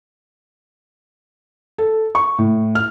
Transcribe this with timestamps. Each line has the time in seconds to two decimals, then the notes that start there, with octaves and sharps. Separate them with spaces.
1.78 A4
2.15 C#6
2.38 A2
2.75 F6